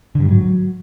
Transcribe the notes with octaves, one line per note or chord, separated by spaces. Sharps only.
D3
G2
G#2
F#3